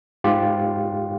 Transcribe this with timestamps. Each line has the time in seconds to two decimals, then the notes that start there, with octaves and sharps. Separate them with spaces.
0.24 G#2 F4 G4